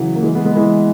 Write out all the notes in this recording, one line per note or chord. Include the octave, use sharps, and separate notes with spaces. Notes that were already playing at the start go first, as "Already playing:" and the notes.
Already playing: C#3 E3 F#3
A#3
E3 G#3
G#3 B3
G#3 B3
E3 G#3